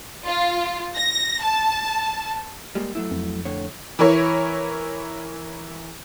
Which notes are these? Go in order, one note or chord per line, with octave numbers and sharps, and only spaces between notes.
F4
A#6
A5
G3 G#3 A#3
F#3 A3 E4
F2
A2 D3 C#5
E3 E4 A#4 C#5